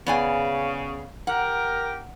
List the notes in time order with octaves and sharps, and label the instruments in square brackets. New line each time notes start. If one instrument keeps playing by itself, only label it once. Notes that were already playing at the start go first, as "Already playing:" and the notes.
[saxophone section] C#3 [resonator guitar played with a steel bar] B3 D5 G#5
[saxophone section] G4 A#4 [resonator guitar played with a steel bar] F#5